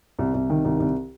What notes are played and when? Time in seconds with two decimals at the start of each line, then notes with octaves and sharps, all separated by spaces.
0.19 C2
0.34 C2
0.50 D#3
0.65 C2
0.80 C2